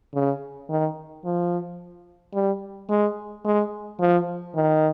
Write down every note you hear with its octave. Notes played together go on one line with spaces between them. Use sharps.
C#3
D#3
F3
G3
G#3
G#3
F3
D#3